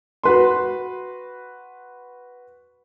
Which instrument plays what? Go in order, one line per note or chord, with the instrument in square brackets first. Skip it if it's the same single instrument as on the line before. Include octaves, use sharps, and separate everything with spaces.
[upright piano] F#4 B4 C6